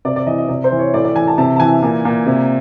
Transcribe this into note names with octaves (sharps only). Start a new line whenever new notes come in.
C3 D5
D5
E3 D#5
D#5
C3 D5
C5
E3
C#5
A2 D5
D5
E3 G#5
A5
C3 A5
A5
E3 G#5
A#2
A#2
C3